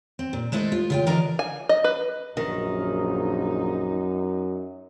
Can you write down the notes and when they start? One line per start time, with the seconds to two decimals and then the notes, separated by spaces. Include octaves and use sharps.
0.19 C4
0.33 A#2
0.52 G#3 A3 E4 A4 C5
0.72 F4
0.90 C#3 F4 G5
1.06 D3 E3 A#4 D5 D#5 A#5
1.39 G#5
1.69 D#5
1.84 B4
2.37 A#1 F#2 D#3 D#4